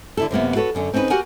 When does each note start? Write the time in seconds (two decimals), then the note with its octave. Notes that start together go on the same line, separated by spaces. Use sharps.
0.17 D3 E4 A4
0.31 F#2 C3 A#3 B3
0.55 F#4 A4 B4 C#5
0.75 F#2 D3 C#4
0.93 C4 C#4 D#4 F#4 B4
1.10 F#4 G4 A#4 F#5 G#5